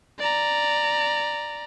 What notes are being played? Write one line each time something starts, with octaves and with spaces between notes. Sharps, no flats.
D5 A#5